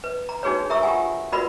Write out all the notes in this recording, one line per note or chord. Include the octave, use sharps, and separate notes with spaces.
B4
A#5
D4 D#4 F#4 G#4 B4 C#5
A#4 E5 A#5 C#6 D#6 E6
F4 G4 F#5 G#5
F4 F#4 A#4 B4 D5 B5